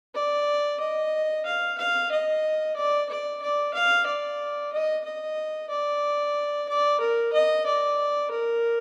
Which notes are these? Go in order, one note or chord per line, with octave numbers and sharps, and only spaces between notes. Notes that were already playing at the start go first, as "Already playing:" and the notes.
D5
D#5
F5
F5
D#5
D5
D5
D5
F5
D5
D#5
D#5
D5
D5
A#4
D#5
D5
A#4